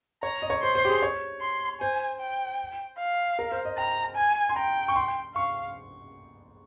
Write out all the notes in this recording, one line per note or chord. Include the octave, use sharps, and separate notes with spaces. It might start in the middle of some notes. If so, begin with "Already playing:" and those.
C#5 A#5
D#5
C#5
C5 C6
C5
G4
G#4
C#5
C6
C5 G#5
G5
F5
A#4
C5
D#5
G5 A#5
G#5
C6
G5 A#5
C#6
C6
F5 C#6